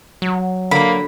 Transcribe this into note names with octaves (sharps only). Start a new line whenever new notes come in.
F#3
D3 A#3 B5